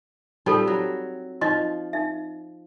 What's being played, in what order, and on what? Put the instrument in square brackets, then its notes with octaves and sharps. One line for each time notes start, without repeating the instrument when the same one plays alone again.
[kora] F3 G3 C4 [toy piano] D#4 A4
[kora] F#3
[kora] F3 [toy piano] D#4 D#5 C6
[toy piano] D#4 E5